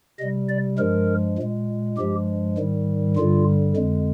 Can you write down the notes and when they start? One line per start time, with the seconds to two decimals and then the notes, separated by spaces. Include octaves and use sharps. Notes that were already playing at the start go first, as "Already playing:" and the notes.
0.19 C3 G3 D#5
0.49 D5
0.78 G2 F3 G#3 A#4
1.39 A#2 G#3
1.98 G2 F3 G#3 G4
2.58 G#2 D#3 G3
3.16 G2 D3 G3 F4
3.76 F2 D3 G#3